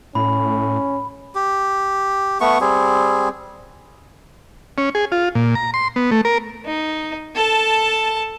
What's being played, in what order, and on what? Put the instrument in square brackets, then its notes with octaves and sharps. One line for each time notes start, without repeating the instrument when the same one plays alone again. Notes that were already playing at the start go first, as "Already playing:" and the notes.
[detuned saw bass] A2 [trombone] C#4 [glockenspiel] B5
[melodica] G4
A3 B3 C#6
G3 C4 G#4
[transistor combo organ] C#4
G#4
F4
A#2
A#5
C6
B3
A3
A#4
[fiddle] D#4
A4 A5